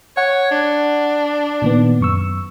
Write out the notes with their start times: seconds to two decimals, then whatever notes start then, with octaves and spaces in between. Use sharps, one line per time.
0.17 C#5 F#5
0.51 D4
1.62 A#2 D#3 B3
2.01 F#2 C#6 E6